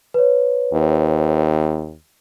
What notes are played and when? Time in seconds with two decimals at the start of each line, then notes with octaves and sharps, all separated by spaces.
0.14 B4 C#5
0.73 D#2